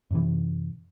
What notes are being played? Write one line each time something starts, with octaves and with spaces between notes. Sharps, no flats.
F#2 C3 E3